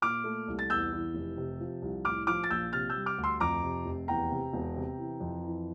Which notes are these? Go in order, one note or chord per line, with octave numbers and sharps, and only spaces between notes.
A#2 D6 F6
A3
C2
A6
E2 E6 G6
E3
F1
C3
F3
C2
A2 D6 F6
F3 D6 F6
A6
A#1 E6 G6
C3 F6 A6
E6 G6
G3
D6 F6
D2
C6 E6
F2 A#5 D6
C3
F1
E2 G5 A#5
C3
E1
C3
E3
F2
E3